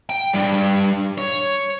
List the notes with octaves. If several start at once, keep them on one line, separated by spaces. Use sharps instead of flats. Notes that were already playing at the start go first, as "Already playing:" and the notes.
G5
G2
C#5